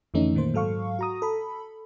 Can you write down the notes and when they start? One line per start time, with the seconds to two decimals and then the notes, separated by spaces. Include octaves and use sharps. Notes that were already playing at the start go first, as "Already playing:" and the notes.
0.14 F2 D3 E3 A3 C#4 D#4
0.35 A#2 D#3 A#3 C5
0.54 G#2 F#3 A4 F5 C#6
0.99 F#4 A#5 D#6
1.22 A4 B5